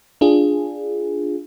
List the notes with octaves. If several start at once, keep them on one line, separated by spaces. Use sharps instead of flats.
D4 F4 G#4